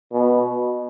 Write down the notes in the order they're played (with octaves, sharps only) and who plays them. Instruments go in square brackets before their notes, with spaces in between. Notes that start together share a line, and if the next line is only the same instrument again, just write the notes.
[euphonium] B2